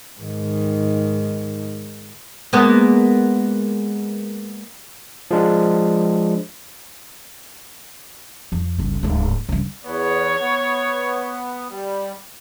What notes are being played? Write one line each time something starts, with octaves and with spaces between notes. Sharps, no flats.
G#2 D#3
G#3 A#3 B3
F3 G#3 D4
F2
G1 C#2
D1 G#2
C#2 G2
E2 B3 C#5
B3
G3